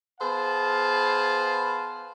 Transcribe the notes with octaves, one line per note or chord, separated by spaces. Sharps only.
B3 G#4 B4 C5 F5 A5